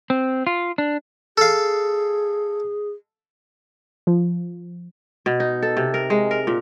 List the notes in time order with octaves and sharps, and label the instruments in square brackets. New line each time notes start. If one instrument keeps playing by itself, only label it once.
[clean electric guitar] C4
F4
D4
[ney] G#4 [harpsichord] A4 F5
[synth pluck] F3
[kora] B2
D#4
A4
C3
A#4
G#3
A#4
A#2